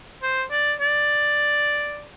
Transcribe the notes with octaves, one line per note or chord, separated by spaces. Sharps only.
C5
D5
D5